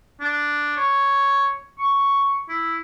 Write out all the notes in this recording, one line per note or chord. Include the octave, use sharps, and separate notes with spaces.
D4
C#5
C#6
E4